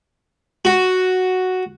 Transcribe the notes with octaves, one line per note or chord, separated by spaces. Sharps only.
F#4